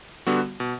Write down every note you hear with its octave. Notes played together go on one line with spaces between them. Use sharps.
D3 G3 B3 F#4
B2